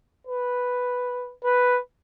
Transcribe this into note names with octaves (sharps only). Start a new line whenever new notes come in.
B4
B4